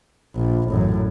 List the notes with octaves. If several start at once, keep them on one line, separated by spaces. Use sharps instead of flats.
A#1
A1 F#2